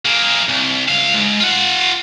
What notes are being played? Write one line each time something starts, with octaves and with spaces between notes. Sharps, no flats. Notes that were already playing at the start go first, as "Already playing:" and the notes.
A#3 G#4
C2
C#2 F5
G#2
F4 F#5